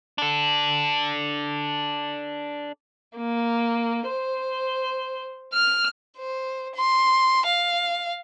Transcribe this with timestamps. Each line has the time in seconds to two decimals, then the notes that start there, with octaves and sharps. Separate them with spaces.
0.18 D4 A4
3.16 A#3
4.08 C5
5.53 F6
6.18 C5
6.75 C6
7.46 F5